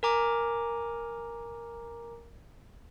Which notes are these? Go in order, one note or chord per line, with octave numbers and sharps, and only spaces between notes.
A#4 G#5 A#5 D6